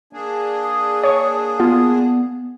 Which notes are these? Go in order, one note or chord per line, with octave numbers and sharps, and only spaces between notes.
A#3 D4 G#4
D#6
C#5 C#6
B3 F4